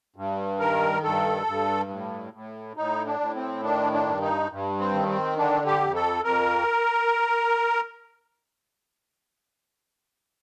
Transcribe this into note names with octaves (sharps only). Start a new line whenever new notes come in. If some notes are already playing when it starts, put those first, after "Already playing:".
G2
D#3 A#4
G2 A4
G2
A2
A2
A2 D#4
D4
A2
C4
D#3 D4
D4
G2
D#4
G2
C4
D#3
C4
D3 D4
G4
F2
A4
F2 A#4